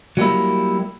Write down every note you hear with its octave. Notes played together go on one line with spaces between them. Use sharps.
F#3 G3 A#3 E4